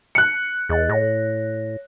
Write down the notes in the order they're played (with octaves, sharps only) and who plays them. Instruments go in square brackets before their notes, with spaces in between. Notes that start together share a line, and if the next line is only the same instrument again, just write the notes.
[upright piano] F#6 C#7
[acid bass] E2 [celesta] G#4 D#5 A6
[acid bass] A2 [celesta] C#5 A#6